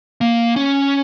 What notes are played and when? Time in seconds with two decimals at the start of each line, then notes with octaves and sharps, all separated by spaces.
0.21 A#3
0.56 C#4